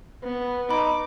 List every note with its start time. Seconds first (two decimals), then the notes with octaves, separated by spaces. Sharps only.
0.24 B3 B4
0.70 D#4 B5 D6